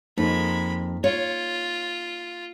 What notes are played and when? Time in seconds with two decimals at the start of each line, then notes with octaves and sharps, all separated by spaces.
0.18 F2 G#3 A#3 D#4 B5
1.04 F4 C#5